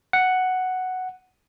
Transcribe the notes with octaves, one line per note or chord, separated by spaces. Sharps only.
F#5